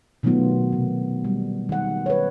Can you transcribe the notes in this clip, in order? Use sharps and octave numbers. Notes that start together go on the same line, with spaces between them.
B2 D#3 F#3 A3 B3 F4
C3
G3
D#3 F#5
B4 C#5